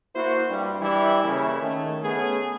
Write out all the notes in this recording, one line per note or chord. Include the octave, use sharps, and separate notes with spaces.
A#3 E4 F#4 C5
G2 G3
E3 G3 E4
C#3 A#3 C#4 E4
D#3 A3
A3 B3 C#4 G#4